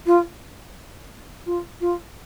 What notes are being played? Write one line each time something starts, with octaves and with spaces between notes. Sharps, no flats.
F4
F4
F4